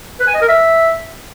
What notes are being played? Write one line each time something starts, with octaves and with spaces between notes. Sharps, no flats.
B4
G#5
D#5
A#4
E5